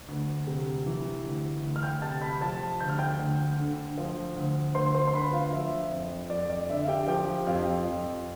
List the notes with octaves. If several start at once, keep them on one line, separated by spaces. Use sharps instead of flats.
D2
C3
E3
D2
D2
F6
G5 G6
C3 A5 A6
B5 B6
F3 A5 A6
D2 G6
F6
G5 G6
D2
D3
F3
D2
D2 C5 C6
C5 C6
C6
D3 B4 B5
F4 F5
F3 E5
F2
F2 D5
D5
D3 E5
F5
G4 G5
F3 G4 G5
F2 F4 F5
F2